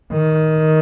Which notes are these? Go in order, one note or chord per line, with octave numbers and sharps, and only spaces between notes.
D#3